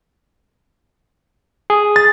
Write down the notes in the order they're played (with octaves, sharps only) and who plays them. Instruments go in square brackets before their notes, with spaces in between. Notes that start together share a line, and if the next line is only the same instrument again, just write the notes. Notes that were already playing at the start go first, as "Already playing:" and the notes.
[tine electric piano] G#4
[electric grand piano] A6